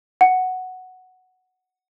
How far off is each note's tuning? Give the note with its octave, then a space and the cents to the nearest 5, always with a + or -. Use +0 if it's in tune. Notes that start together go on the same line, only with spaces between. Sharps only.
F#5 +0